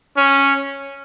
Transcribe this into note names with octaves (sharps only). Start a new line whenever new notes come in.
C#4